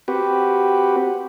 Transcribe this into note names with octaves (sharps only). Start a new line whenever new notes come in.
C4 F#4 G4 B4